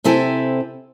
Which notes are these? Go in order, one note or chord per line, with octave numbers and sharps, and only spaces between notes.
C3 C4 E4 A4 G#5